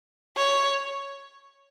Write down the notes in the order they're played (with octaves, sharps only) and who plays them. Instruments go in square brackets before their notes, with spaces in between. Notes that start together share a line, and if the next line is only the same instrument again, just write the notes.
[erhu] C#5